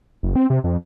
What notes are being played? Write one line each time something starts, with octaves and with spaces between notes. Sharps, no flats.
F#1
C4
C3
F2